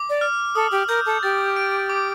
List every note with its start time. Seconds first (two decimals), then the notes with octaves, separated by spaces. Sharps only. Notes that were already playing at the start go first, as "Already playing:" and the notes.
Already playing: D6
0.09 D5
0.21 F6
0.55 A4 D#6
0.71 G4
0.88 A#4 G6
1.06 A4
1.23 G4 A6
1.56 D7
1.90 D6